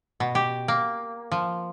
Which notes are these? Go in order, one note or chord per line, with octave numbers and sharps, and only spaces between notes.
B2
G4
A#3
F3